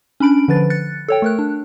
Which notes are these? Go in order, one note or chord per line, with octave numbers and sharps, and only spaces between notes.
C#4 D4 B5 D7
D3 F3 B4 A6
F#6 A6 C#7
A4 C#5 G5
A3 A#4 F#6
D4